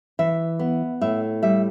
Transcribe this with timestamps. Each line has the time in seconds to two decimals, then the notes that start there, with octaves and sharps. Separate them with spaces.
0.19 E3 E5
0.59 B3
1.01 A2 E5
1.43 G3 E5